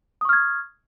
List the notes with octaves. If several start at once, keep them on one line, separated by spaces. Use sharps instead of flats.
C#6 D#6 F6 G#6